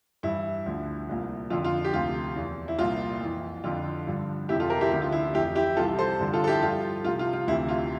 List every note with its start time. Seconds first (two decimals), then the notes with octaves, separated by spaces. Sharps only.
0.23 G2 E3 E4
0.66 D2 D3 F3
1.09 C2 A#2 F3
1.50 F2 D3 F3 F4
1.64 F4
1.84 G4
1.94 D2 C3 F3 F4
2.35 E2 E3
2.68 E4
2.79 C2 A#2 F3 F4
3.21 F2 E3
3.64 F2 D3 F3 F4
4.07 G2 D3 F3
4.49 F2 C3 E3 E4 G4
4.60 F4 A4
4.70 G4 A#4
4.81 E4 G4
4.91 D2 D3 F3 E4 G4
5.02 F4
5.12 E4
5.34 F2 E4 G4
5.38 E3
5.55 E4 G4
5.76 C2 C3 E3 F4 A4
5.98 A4 C5
6.19 G2 D3 F3
6.33 F4 A4
6.44 A4
6.47 E4 G4
6.62 G2 F3 F4
7.04 C2 C3 F3 F4
7.19 F4
7.33 F4
7.47 D2 C3 E3 E4
7.68 F4